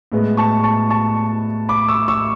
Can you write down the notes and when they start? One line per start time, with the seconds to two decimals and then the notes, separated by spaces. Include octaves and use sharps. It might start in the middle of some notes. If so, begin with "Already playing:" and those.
0.12 A2 G#3 B3
0.37 A5 C#6
0.64 A5 C#6
0.90 A5 C#6
1.69 B5 D6
1.88 C#6 E6
2.08 C#6 E6